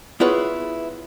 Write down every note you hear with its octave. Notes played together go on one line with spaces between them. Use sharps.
B3 E4 F4 G#4 B4 C#5